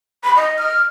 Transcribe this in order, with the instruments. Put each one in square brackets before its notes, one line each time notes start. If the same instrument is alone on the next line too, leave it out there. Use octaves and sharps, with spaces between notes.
[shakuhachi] B5
D#5
[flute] F6